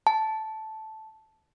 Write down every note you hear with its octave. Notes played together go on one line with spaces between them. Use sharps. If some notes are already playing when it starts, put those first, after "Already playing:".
A5